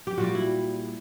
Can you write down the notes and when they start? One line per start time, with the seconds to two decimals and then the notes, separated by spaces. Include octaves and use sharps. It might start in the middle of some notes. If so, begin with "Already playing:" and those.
0.07 G4
0.18 A#2 G3 F#4
0.35 E4